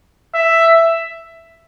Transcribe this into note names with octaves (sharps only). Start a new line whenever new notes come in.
E5